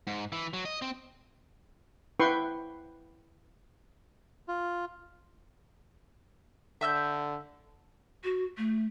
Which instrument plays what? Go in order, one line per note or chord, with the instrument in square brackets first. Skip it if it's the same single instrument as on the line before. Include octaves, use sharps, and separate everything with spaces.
[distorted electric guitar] G#2
E3
F#3
D#5
C4
[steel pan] E4 B4 G5 C6 C#6
[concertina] F4
[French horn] D3 [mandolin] E5 E6 G6
[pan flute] F#4
A3